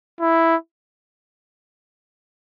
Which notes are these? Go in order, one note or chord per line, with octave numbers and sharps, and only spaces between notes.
E4